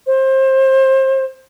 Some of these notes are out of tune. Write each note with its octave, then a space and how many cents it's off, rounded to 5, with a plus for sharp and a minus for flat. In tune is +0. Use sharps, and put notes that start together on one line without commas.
C5 +25